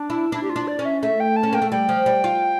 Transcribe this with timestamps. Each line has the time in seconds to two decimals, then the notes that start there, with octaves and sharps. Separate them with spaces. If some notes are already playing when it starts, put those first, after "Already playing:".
Already playing: D4
0.10 E4
0.32 D4 E4
0.43 G4
0.50 F4
0.56 D4
0.68 D5
0.79 C#4
0.85 E5
1.02 A3 E5
1.20 G5
1.36 A5
1.43 C#4
1.53 A#3 G5
1.62 A3
1.71 G3 G5
1.89 F3
2.06 G3
2.24 F4